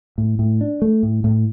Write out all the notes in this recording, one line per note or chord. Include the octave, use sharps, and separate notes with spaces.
A2
A2
D4
A3
A2
A2